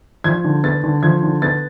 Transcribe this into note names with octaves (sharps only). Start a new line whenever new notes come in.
F3 G#6
D3
B3 A6
D3
F3 G#6
D3
B3 A6